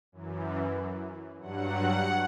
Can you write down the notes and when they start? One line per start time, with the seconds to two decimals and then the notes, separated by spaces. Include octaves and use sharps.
0.12 F#2 E3
1.40 G2 F#3 F#5